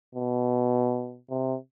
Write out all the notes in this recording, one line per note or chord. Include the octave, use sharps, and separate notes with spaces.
B2
C3